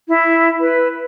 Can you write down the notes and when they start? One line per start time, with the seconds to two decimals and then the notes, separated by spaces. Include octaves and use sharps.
0.08 E4
0.60 B4